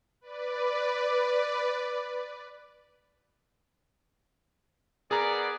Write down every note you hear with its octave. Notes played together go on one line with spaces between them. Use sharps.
B4 D5
B3 G#4 A#4 D5 A#5